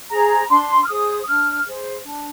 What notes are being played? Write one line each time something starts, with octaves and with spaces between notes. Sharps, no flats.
G#4 C5 A#5
D4 C6
F6
G#4 C5 D#6
D4 F6
G#4 C5
D4